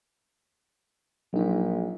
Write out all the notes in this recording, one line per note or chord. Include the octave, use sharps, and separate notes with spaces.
A#1 F#3 D#4